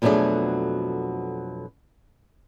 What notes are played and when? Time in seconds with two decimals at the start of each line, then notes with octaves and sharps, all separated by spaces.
0.02 F2 B2 F#3 A3 D4 G#4